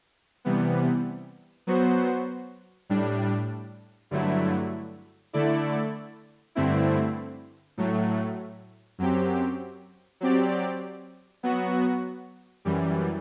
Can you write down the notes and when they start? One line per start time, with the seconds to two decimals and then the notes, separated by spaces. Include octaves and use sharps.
0.45 C3 E3 G3 B3
1.67 F#3 B3 F#4 C5
2.90 A2 G3 D4
4.11 G2 D3 F#3 A3 E4
5.33 D3 A3 E4 A4 D5
6.55 G2 D3 A3 C4 E4
7.77 A2 F#3 A3
8.98 F#2 F#3 C4 G4
10.21 F#3 C4 G4 D5
11.43 F#3 B3 F#4
12.65 F#2 E3 G3